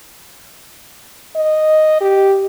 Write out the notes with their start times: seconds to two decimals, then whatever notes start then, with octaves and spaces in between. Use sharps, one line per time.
1.35 D#5
2.01 G4